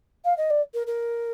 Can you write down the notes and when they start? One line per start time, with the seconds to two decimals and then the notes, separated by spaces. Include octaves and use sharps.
0.25 F5
0.37 D#5
0.50 D5
0.74 A#4
0.87 A#4